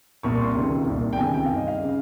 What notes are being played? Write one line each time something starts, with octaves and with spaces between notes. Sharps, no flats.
C2 A#2 C#6
C6
C#2 C3 D#3
C2 A#2
G5
C#2 C3 D#3 G#5
G5
G2 D#3 F5
D#5
F5
C#3